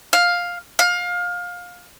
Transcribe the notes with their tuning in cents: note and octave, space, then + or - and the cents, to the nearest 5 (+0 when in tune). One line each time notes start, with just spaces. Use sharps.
F5 +10
F5 +25